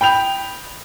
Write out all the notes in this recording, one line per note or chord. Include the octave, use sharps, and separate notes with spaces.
G5 B5 G6 F7